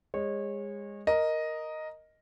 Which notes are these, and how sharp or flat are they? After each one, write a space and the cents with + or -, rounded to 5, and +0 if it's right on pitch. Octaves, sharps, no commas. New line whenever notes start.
G#3 -30 C#5 -25
A#4 +0 D#5 +0